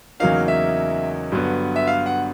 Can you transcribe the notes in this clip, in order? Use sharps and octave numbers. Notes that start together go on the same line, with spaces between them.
E2 C#3 F#3 A#3 D#4 F5
E5
G2 D3 F#3 B3
E5
F5
F#5